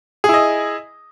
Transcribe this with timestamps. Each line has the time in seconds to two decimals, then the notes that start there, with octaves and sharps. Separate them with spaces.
0.24 G#4
0.29 E4
0.34 D#5